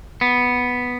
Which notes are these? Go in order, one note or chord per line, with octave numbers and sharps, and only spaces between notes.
B3